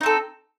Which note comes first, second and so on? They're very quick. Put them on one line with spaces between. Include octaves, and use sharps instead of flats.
D#4 C4 A4